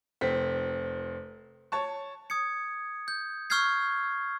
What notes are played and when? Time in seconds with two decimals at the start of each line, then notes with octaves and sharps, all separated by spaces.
0.21 F1 C4 B6
1.72 C#5 A5 C#6
2.30 D#6 G#6 C#7
3.08 G6
3.50 C#6 E6 F6 G6 G#6 C7